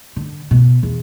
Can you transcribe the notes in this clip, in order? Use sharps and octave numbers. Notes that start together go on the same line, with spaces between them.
D3
B2
E2